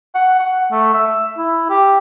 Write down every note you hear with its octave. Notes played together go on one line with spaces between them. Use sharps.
F#5
F#5
A3
E5
E4
G4